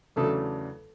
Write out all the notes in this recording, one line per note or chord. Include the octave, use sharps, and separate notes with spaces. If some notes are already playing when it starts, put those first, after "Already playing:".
E2 C#3 F#3 A3 D4 A4